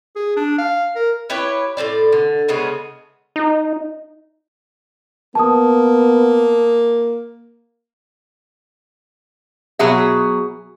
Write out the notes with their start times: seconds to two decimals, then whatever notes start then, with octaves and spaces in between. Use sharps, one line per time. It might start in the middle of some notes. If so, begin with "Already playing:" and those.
0.16 G#4
0.36 D4
0.58 F5
0.96 A#4
1.30 E4 G4 B4 C#5
1.77 A2 A#3 C5 D5
2.13 D3
2.48 C#3 G#3 A3 B3
3.36 D#4
5.35 A#3 B3 A5 D#6
9.79 B2 F#3 G#4 E5